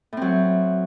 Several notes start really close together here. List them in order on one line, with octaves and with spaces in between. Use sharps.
A2 C4 F#3